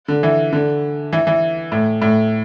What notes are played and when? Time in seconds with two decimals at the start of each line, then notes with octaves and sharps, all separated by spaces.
0.08 D3
0.23 E3
0.53 D3
1.13 E3
1.27 E3
1.72 A2
2.02 A2